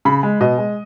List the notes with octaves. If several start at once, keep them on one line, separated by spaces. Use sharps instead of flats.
C#3 B5
G#3
B2 D#5
G#3